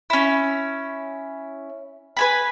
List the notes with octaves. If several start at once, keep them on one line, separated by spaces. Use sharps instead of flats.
C#4 E4
B4 G#5 B5